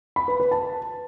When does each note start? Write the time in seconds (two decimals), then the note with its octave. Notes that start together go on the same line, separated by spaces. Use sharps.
0.16 B5
0.28 B4
0.40 B4
0.51 A5